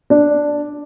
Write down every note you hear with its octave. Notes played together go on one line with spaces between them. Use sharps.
D4